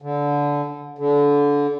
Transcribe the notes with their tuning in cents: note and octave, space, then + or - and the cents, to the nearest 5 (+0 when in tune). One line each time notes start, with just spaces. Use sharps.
D3 -20
D3 -25